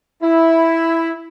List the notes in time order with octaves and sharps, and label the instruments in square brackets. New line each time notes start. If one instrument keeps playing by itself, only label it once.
[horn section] E4